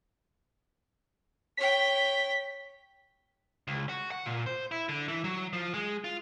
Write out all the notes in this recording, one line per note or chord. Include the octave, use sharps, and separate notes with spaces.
C#5 G5 B6
C#2
F#4
F#5
A#2
C5
E4
D3
E3
F#3
F3
G#3
F4